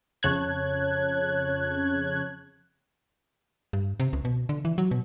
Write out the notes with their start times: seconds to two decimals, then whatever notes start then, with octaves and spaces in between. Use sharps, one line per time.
0.23 F2 C#3 C#5 A5 F#6 G#6
3.73 G2
4.00 C3
4.13 C#2
4.25 B2
4.49 D3
4.65 E3
4.78 F#3
4.91 B2